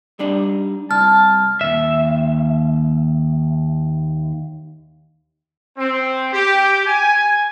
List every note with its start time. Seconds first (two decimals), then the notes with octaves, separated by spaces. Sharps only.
0.19 G3 D4 D#4
0.91 C2 A5 F6
1.61 D#2 E5
5.78 C4
6.33 G4
6.86 G#5